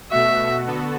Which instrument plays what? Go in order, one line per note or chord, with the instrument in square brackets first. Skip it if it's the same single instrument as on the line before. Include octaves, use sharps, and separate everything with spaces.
[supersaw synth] B2 A3 F#4 [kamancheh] E5
[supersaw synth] D3 B3 F#4 A4